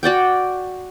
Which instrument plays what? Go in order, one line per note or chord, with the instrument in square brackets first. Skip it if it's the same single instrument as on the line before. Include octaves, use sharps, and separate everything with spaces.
[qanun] F#4 D5 F#5 G5